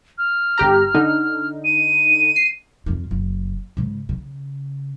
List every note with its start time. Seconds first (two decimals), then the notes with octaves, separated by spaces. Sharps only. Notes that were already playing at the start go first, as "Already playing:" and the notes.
0.18 F6
0.58 G1 G4 A#5
0.94 D3 D#4
1.64 D#7
2.36 C7
2.86 F2 F4
3.11 F#1
3.77 G#2 C#3
4.09 C#3